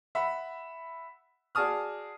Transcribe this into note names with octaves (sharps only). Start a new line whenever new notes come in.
E5 F#5 B5
F#4 G#4 D5 A5 D#6 F6